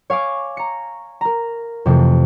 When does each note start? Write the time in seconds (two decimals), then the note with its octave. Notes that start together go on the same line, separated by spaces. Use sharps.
0.10 C#5 F5 G#5 D6
0.57 A#5 C#7
1.21 A#4 A#5
1.86 F2 C3 E3 A3